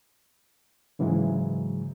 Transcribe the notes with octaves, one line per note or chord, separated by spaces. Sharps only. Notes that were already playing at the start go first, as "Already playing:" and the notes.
G#2 C#3 E3 F#3 G#3